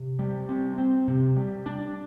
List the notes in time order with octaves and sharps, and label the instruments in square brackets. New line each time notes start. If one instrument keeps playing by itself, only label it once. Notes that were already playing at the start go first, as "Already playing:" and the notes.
Already playing: [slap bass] C3
G3
C4
C4
C3
G3
D4